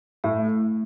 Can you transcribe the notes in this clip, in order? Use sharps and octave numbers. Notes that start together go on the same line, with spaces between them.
A2 A3